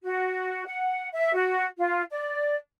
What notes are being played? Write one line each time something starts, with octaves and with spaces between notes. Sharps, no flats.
F#4
F#5
E5
F#4
F4
D5